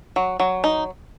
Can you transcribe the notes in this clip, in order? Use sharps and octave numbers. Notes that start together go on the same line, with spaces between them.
F#3
F#3
D#4